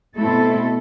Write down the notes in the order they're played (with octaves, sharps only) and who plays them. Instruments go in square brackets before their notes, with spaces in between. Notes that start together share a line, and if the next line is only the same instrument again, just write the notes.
[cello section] B2 A3 C4 E4 A4